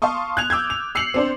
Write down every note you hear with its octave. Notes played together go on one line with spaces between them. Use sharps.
F5 A5 C6 C#6 D#6
F#6 G#6 F7
D6 E6 G6 G#6
F7
E6 C7 C#7 F7 F#7
C4 D4 C5